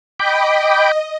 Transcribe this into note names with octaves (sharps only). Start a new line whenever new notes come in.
D#5 G5 B5 D6